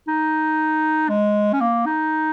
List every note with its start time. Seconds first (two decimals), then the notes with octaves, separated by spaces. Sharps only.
0.08 D#4
1.09 G#3
1.53 C#4
1.61 A#3
1.86 D#4